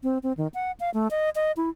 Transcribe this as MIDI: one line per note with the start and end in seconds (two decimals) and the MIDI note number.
0.03 0.18 60
0.23 0.33 60
0.37 0.48 51
0.54 0.72 78
0.80 0.90 77
0.94 1.08 57
1.11 1.30 75
1.35 1.52 75
1.57 1.69 64